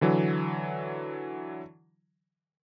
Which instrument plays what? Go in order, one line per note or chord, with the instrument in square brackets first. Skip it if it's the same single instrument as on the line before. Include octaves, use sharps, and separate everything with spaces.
[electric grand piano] D3 E3 F#3